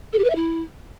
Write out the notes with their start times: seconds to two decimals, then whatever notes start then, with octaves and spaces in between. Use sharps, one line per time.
0.13 A4
0.18 G4
0.24 B4
0.30 E5
0.35 E4